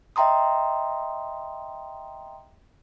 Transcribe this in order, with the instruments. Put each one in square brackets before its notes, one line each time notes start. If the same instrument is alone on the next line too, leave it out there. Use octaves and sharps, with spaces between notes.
[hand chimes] D#5 E5 G5 A#5 C6 D#6